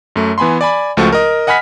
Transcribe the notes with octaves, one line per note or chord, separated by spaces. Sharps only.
F#2 A3
E3 B3 G#5 B5 C6
D5 G#5 B5
C#2 F3 A3 F#4 C#6
A#4 D#5
D#5 F#5 G#5 B5 F6 B6